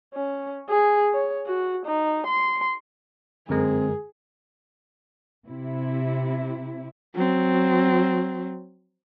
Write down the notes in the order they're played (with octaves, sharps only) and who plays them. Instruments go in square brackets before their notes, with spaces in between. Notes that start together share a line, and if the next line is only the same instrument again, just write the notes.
[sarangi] C#4
G#4
C#5
F#4
D#4
C6
[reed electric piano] F#2 A#4 [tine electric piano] D3 G#3 [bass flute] C4 [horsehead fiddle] G#4
[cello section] C3 E4
[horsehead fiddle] F#3 C4